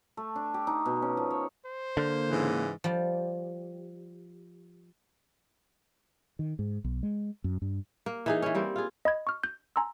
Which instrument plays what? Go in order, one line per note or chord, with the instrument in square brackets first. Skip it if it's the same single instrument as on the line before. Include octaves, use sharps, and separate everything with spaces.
[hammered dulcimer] A3
D4
G4
D#4
B2
C#4
F3
C#5
[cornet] C5
[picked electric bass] D3 [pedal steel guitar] A#3 F6 G6
[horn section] G#2 C#3 E3
[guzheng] F3 G3
[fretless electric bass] D#3
G#2
B1
G#3
F#2
G2
[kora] A#3
E3 D#4 G#4
E3 C#4
G3 A#3 C4
F4 G#4
[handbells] D#5 B5 G#6
C#6 F6
G6
G#5 A#5 C6 E6